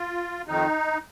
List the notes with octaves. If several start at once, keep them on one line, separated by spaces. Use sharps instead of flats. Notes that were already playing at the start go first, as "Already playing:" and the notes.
Already playing: F4
F2 D#3 D#4